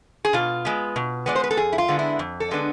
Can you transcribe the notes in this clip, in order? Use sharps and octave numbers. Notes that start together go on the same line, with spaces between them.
G#4
B2 F4
G#3 B3
B2
G#3 B3 D5
C5
B4
A4
F2 G#4
E4
F4
D3 G#3 B3 D4
E4
F2
A4
D3 G#3 B3 D4